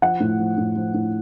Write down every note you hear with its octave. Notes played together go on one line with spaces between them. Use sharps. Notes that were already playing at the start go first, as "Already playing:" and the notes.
F3 F#5
A2
F3
A2
F3
A2